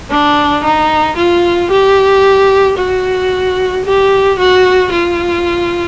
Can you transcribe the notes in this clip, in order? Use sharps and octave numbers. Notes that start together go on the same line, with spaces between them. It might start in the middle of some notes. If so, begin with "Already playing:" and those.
D4
D#4
F4
G4
F#4
G4
F#4
F4